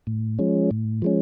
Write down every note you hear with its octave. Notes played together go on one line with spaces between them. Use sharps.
A2
F3 G#3 C#4
A2
F3 G#3 C#4